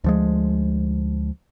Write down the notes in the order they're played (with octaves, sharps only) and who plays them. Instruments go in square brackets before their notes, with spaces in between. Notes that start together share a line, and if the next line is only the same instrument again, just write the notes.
[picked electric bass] D2 F3 G#3